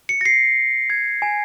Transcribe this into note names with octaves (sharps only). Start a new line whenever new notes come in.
C#7
A#6
C7
G#6
G#5